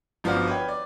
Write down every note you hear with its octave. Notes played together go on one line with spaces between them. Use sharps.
G1 F3 B3 D4 F#4 F6
B4 C#5 G5
D5